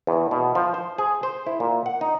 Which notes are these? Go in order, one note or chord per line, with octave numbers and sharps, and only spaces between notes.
E2
B2
F3
C5
G#4
C5
E4
A#2
F#5
D#4